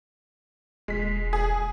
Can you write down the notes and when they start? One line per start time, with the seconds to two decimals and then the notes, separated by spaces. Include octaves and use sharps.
0.88 E1 G#3 B6
1.33 G#4